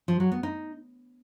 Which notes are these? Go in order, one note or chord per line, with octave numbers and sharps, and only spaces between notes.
F3
F#3
B3
D#4